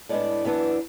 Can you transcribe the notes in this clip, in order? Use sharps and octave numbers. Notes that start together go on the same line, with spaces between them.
A2 G#3 B3 D4 D5
F#2 E3 B3 D4